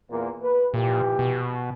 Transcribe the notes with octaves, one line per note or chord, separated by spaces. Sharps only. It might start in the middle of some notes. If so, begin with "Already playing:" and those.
E2 A#2 A#3
B4
A#2 E3 F3 G4
B2